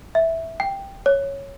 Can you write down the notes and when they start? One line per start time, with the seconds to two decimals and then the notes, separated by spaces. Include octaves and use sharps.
0.15 E5
0.60 G5
1.06 C#5